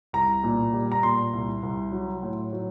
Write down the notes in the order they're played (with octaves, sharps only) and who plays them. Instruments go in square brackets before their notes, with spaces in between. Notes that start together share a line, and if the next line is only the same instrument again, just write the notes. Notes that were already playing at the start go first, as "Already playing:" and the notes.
[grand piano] C2 A#5
A#2
G3
A#5
A#2 C6
C2
C2
F#3
A2
F#3